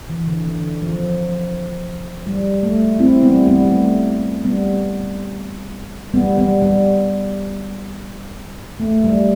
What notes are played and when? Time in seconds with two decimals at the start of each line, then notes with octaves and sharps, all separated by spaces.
0.10 E3
0.27 D3
0.46 D3
0.82 F3
2.27 G3
2.63 A3
2.99 C4 E4
3.23 G3 B3
3.48 G3 B3
3.64 G3
3.72 A3
4.44 G3 B3
6.14 G3 B3
6.38 G3 B3
6.62 G3 B3
8.80 A3
9.04 G3